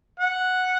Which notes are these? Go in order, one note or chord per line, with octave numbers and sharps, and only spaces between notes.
F#5